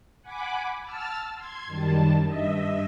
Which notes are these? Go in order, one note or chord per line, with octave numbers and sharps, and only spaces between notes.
F#5 G#5 B5 D6
A5 E6 F6 A6
C6 G#6
F#2 D#3 G3 A5
G2 D#5 E5